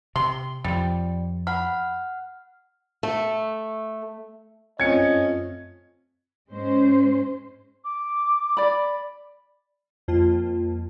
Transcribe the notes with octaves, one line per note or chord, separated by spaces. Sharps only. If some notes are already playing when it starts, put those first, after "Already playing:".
C3 C6
F2 F3 G3
F#5 B5 F6
A3
F#2 A3 C4 C#4 F4 D#5 G#6 C#7
G#2 G#3 C#4 C5
D6
D5 B5
F2 A#3 F4 A5